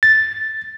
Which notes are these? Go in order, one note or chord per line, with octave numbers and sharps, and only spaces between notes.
A6